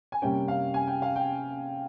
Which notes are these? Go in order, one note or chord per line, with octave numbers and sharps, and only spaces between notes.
G#5
C3 G3 A#3 C#4 G5
F5
G#5
G5
F5
G5